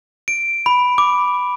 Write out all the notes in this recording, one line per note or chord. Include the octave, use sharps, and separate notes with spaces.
D7
B5
D6